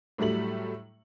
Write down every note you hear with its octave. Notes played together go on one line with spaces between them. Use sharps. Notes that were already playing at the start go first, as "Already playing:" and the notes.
A2 F#3 G3 A3 F#7